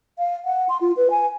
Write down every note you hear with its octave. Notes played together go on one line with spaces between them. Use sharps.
F5
F#5
C6
F4
B4
G#5